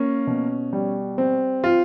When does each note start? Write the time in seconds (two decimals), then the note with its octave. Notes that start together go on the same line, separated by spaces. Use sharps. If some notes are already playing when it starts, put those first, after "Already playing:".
Already playing: A#3 C#4
0.27 B2
0.73 G3
1.18 C4
1.64 F4